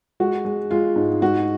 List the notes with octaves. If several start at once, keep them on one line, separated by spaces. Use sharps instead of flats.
G#3 F#4
G#3
G#3 F4
G#2
G#2 F#4